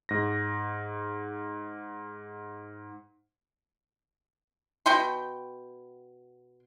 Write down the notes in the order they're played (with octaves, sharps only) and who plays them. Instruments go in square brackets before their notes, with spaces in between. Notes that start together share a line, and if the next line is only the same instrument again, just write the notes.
[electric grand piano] G#2 A#6
[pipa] B2 G5 C6